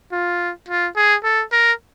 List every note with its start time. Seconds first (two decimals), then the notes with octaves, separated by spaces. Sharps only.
0.12 F4
0.68 F4
0.96 G#4
1.24 A4
1.52 A#4